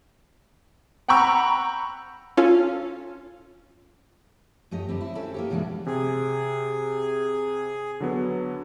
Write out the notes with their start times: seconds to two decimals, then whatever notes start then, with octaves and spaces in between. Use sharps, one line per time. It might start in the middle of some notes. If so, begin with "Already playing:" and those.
1.08 F#5 G5 A#5 B5 C#6 E6
2.37 C#4 F4 A4
4.71 F#2 A3 G4 D#5
4.88 D3 G3 C4
5.01 E4
5.15 C4 C#4 A4
5.34 A#3 D#4 G4
5.50 D2 B2 E3 G#3 A3 D4
5.87 C3 G#4
8.00 D3 F#3 B3